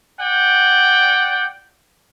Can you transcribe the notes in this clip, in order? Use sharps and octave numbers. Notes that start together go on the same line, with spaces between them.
D5 F#5 G5